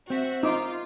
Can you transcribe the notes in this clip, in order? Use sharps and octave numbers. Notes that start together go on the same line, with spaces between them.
C4 F#4 E5
D#4 F4 D6